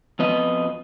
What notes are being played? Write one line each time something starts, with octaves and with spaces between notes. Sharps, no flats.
F2 B3 D#5